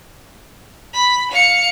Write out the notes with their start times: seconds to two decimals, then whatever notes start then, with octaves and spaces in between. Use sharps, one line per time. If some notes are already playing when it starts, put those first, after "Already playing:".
0.93 B5
1.31 F5 C#7